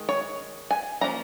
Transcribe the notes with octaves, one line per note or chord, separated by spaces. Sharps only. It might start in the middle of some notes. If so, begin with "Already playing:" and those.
Already playing: D#3 G#3
C#5
G#5
F3 A#3 C#4 A#5